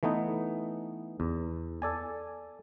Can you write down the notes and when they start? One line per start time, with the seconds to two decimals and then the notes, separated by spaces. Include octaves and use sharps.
0.03 E3 A3 B3 D#4
1.20 E2
1.82 A4 D5 G#5